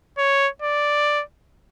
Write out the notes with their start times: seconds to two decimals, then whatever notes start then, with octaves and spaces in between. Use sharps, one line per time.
0.18 C#5
0.62 D5